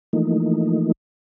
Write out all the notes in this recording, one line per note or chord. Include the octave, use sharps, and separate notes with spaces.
E3 F3 A3 A#3 D#4